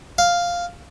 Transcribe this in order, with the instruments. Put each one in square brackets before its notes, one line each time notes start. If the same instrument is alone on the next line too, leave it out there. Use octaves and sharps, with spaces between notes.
[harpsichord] F5